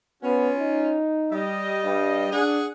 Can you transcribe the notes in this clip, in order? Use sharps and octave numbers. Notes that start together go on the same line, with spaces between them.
B3 C#4 F4
D#4
G3 D#5
G2
D4 G#4 F#5